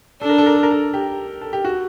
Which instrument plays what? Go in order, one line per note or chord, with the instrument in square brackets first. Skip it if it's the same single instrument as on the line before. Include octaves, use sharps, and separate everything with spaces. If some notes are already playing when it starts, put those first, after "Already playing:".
[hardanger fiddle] D4 [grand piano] A4
[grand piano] A#4
A4
A#4
A4
A#4
A4
G4
A4
G4
F#4